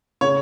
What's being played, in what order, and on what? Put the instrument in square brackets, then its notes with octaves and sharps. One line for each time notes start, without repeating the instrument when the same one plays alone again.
[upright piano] C#3 C#5